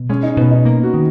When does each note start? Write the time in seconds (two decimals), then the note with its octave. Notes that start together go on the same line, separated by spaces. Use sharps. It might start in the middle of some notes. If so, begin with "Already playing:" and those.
Already playing: B2
0.10 G#3 C#4
0.23 D#4
0.37 B2 B3
0.51 D#4
0.65 A#3
0.83 F#4
0.94 D#3